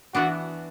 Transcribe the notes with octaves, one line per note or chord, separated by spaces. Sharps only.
E3 B3 D4 F#4